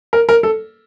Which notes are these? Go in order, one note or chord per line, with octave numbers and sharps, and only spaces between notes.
A#4
A#4
A4